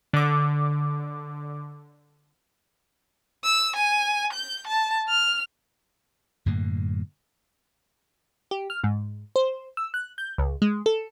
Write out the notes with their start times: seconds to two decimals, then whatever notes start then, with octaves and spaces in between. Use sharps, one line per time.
0.13 D3 D6
3.44 E6
3.76 G#5
4.33 G6
4.67 A5
5.09 F6
6.46 F#2 A2 D3 A#3
8.51 G4
8.70 F6
8.84 G#2
9.36 C5
9.77 E6
9.94 F#6
10.18 G6
10.38 C#2
10.62 G#3
10.86 A4